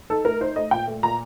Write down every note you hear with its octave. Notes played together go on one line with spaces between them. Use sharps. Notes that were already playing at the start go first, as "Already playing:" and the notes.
D#4 A4
A3 A#4
D#4 C5
A3 D#5
A#2 G5
A3
A#2 A#5